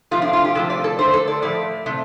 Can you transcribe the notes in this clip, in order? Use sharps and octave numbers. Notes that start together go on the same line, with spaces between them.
C3 F3 A3 F4
D4
F4
G4
C3 F3 A3 A4
D5
A4
D3 A3 C5
A4
D5
A2 F3 A3 D5
C3 A3